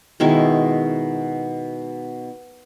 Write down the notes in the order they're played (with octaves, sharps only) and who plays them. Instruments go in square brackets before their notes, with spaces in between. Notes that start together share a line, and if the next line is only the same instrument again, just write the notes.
[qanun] B2 D#3 G#3 E4